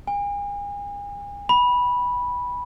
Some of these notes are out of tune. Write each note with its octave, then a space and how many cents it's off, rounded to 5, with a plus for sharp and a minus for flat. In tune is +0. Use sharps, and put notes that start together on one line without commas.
G#5 -40
B5 -10